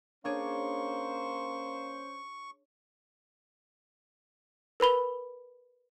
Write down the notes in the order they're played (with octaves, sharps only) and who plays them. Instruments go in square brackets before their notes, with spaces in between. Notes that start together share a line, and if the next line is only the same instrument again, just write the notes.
[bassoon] A#3 [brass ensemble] C#4 C5 [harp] D4 G#4 C#5 [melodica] C#6
[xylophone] A#4 B4 B5 G7